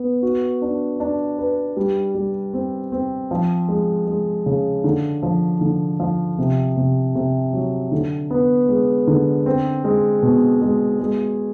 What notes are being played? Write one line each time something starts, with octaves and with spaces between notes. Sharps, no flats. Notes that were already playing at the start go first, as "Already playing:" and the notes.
Already playing: B3
F#4
D4
D4
B4
G3
G3
C4
C4
F3
G#3
G#3
C#3
D3
F3
D3
F3
C3
C3
C3
F#3
D3
B3
G#3
D3
C4
G#3
B2
G#3
G#3